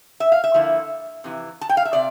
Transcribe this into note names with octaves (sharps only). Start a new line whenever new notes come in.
E5
F5
E5
D3 F3 A#3 E4
F2 C3 E3
A5
G5
F5
E5
C3 D5